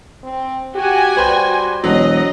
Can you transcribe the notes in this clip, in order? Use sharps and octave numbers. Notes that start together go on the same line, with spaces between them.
C4
F#4 G4 G#5
G3 B4 C5 G5
E1 F#3 D#5